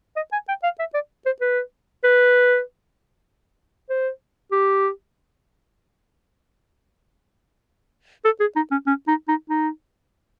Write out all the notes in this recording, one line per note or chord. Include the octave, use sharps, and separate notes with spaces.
D#5
G#5
G5
F5
E5
D5
C5
B4
B4
C5
G4
A4
G#4
D#4
C#4
C#4
D#4
D#4
D#4